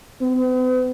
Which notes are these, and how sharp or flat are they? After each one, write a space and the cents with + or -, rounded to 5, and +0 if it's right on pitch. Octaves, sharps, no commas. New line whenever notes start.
B3 +45